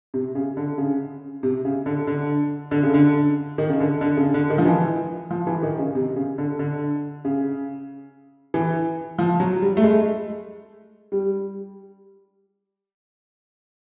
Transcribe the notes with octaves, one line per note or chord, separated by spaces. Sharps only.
C3
C#3
D3
C#3
C3
C#3
D3
D3
D3
C#3
D3
D#3
C#3
D3
D3
C#3
D3
D#3
F3
E3
F3
E3
D#3
C#3
C3
C#3
D3
D3
C#3
E3
F3
F#3
G3
A3
G#3
G3